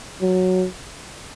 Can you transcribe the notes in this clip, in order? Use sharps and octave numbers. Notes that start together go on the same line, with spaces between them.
F#3